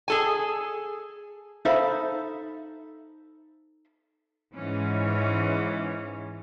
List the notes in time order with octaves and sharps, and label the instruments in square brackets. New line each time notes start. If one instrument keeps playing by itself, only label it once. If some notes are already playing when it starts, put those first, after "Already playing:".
[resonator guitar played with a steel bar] G#4 A4 G#5
[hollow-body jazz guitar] D#4 A4 C5 E5 F5 B5
[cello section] G#2 E3 C#4